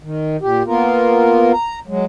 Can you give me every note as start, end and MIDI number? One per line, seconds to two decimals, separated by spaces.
0.03 0.37 51
0.41 0.63 46
0.41 0.63 67
0.66 1.52 58
0.66 1.52 59
0.66 1.52 65
0.66 1.52 70
1.53 1.79 82
1.87 2.05 54
1.87 2.05 56